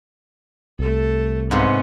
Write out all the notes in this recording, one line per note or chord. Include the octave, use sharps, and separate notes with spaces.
C2 A3 A4
G#2 C3 B3 C#4